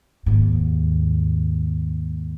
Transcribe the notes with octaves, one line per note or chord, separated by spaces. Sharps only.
D#2 G#2